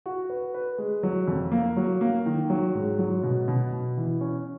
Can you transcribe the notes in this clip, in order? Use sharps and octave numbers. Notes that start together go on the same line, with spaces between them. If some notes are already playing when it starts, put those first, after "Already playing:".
F#4
B4
B4
G#3
F#3
F2
A#3
F#3
A#3
D#3
F#3
G#2
F#3
B2
B2
B2
E3
C#4